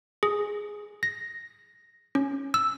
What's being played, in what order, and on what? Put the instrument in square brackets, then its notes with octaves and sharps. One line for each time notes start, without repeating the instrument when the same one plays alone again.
[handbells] G#4
A#6
C#4
E6